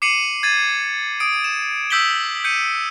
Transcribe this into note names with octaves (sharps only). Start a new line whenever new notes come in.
D6 C7 C#7 D#7 F#7
G#6 A6 D#7
D#6 D7
E7
D#6 E6 G6 B6 F#7 G7
G6 C#7 D#7